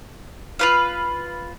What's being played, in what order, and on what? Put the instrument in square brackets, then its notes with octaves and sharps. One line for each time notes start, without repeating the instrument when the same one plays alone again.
[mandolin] F4 B4 F5